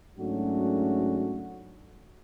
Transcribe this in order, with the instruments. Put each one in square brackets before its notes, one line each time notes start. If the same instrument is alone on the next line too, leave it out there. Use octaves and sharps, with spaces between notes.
[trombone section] G#2 F#3 A3 C#4 D4 F#4